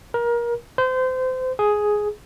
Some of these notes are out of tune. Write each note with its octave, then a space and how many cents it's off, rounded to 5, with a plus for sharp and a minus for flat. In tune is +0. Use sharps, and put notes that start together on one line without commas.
A#4 +25
C5 -30
G#4 +5